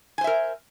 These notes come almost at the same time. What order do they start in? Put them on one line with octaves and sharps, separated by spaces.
G#5 C5 E5 A#4